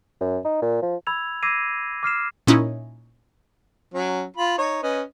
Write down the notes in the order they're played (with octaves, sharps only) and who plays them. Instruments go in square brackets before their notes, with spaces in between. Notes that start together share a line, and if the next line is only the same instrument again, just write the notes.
[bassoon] F#2
D#4
A#2
F3
[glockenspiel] B5 E6 G#6 F7
D6 E6 G#6 A#6 C7 D#7
D6 F6 C7 E7
[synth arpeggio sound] A#2 C#4 D#4 E4
[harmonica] F#3 C#4
F4 B5
D#4 C#5
C#4 B4 D#5